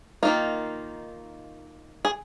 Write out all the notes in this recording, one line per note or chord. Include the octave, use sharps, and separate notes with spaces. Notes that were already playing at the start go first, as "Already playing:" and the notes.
D#3 A#3 D#4 F4
G#4